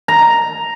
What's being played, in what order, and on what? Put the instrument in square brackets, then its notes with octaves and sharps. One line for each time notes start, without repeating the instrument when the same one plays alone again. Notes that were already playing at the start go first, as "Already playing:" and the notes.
[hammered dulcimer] A#5